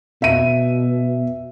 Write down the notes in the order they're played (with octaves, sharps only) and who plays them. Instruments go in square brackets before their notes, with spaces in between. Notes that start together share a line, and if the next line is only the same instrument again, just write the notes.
[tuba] B2 [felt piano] E5 D#7